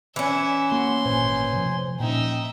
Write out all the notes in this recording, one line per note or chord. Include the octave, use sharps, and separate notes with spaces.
E3 C#4 E5
A#3 F#4 C6
G#1 A#2 C5 G#5
C3 F3
A#2 C#4 D#4 E5 G5